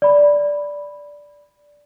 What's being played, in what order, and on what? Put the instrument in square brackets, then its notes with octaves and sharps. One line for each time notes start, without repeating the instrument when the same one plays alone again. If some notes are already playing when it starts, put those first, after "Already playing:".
[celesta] D5 B5